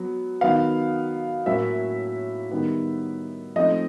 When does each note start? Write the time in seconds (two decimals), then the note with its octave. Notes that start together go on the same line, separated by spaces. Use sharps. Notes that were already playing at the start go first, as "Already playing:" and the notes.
Already playing: F#3 B3
0.41 D#3 F#3 B3 F5
1.46 A2 F#3 A#3 C#4 E4 E5
2.51 D#3 G3 B3
3.56 F3 A3 C4 D#4 D#5